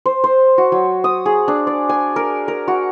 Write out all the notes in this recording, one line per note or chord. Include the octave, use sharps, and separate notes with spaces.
C5
C5
F#4
F#3
D#6
G#4
D4
D5
G#5
A#4
A#4
F#4